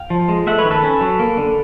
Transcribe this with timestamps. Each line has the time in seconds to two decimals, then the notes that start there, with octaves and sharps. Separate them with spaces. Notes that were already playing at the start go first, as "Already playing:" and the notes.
Already playing: F5 G5
0.10 F3
0.29 G#3
0.46 A3 E5 F#5
0.59 B4 C#5
0.65 D#3
0.71 A4 B4
0.83 C#4
1.01 F#3
1.19 A#3
1.37 D3